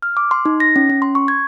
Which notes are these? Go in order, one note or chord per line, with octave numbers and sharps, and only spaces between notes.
F6
D6
C6
D#4
A#6
C#4
C#4
C6
C#6
G#6